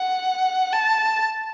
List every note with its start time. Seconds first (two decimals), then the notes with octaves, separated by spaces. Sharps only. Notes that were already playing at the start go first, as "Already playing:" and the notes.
Already playing: F#5
0.73 A5